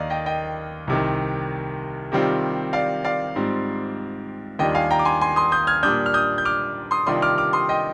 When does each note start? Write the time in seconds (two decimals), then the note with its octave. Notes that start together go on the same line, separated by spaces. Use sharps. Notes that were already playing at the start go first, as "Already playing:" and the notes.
Already playing: D#2 D#3 A#3 D#4 D5 D#5 F5
0.10 D#5 G5
0.26 D#5 G5
0.87 C2 C3 D#3
2.12 C3 D#3 G3 C4 F4
2.73 D5 F5
3.04 D5 F5
3.36 G#2 G3 C4 F4
4.59 D#2 D#3 G3 D4 F4 D#5 G5
4.75 F5 G#5
4.91 G5 A#5
4.99 D6
5.05 G#5 C6
5.21 G#5 C6
5.36 C6 D#6
5.52 D#6 G6
5.67 F6 G#6
5.83 A#2 G3 D4 D#6 G6
6.06 F6
6.14 D#6 G6
6.38 G6
6.45 D6 F6
6.91 C6 D#6
7.07 C3 D#3 G3 D4 F4 C6 D#6
7.22 D6 F6
7.38 D6 F6
7.53 C6 D#6
7.69 D#5 G5